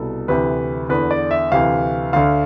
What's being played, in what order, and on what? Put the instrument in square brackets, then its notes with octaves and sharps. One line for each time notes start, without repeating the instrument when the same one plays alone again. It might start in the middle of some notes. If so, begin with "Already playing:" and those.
Already playing: [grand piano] C2 B2 A4
D2 C3 E3 B4
E2 D3 B4
D5
E5
D2 C3 E3 F5
D2 D3 F5